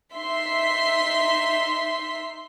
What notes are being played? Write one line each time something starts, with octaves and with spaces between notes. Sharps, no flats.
D#4 E5 C6 B6